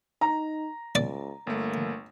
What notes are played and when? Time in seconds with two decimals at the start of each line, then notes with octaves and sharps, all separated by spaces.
0.21 D#4 A#5
0.95 C#2 D5
1.47 G1 A3 A#3